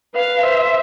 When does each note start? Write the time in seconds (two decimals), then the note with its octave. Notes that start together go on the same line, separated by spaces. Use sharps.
0.14 B4 F5
0.42 C5 E5